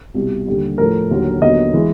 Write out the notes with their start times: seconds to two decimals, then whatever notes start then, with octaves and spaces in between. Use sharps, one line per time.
0.14 C2 B2 G3
0.47 D#2 D3 G3
0.78 A2 F3 A3 A#4
1.11 D#2 D3 F#3
1.42 D#2 D3 F#3 B3 D#5
1.74 E3 G#3